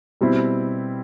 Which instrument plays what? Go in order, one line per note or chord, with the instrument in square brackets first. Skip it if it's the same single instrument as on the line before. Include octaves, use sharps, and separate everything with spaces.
[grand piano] B2 G3 C4 E4